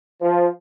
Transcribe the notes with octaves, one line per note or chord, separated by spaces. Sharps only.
F3